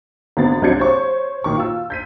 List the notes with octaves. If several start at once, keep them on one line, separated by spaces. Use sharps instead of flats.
G#1 D3 B3 A6
C2 F#3 D4 G6 G#6 C#7
C5 C#5 C#6
A#2 D#3 C#6
F4 E6
G6 B6 D#7